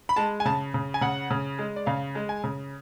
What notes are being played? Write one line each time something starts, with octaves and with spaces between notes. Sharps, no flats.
B5
G#3 A5
G#5
C#3 A5
C#3
G#5
C#3 F#5
C#3
G#3
D5
C#3 F5
G#3
G#5
C#3